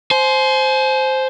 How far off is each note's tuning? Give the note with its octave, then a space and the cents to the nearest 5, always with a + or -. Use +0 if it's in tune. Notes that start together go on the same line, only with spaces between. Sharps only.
C5 +0 G#5 +40